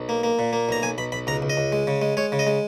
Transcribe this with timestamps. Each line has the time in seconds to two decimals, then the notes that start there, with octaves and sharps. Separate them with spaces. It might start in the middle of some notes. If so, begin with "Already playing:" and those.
Already playing: B1
0.09 A#3
0.24 A#3
0.39 A#2
0.53 A#3
0.69 B1 A#5
0.83 B1 G#5
0.98 B1 B5
1.12 B1 B5
1.27 C#2 A#5
1.42 C#2
1.50 D#5
1.57 C#2
1.72 G#3
1.87 C#3
2.02 G#3
2.17 G#3 C#5
2.32 C#3
2.39 D#5
2.47 G#3